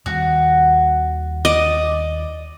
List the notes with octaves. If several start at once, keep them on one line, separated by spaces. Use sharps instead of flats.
D#2 D#3 G3 F#4
D5 D#5